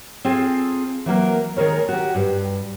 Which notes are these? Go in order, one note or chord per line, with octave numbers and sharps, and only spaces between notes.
C4 F4 G#4 A4
E3 F#3 A#3 A#4
D#3 G#3 A#4 C#5
F#4 G4
G2